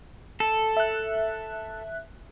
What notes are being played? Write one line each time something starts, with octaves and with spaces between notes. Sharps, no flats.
A4
E5 F#6